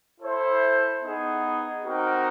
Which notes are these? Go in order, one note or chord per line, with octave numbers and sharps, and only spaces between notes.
E4 A4 C5 E5
B3 D#4 G#4
C4 D#4 F#4 A#4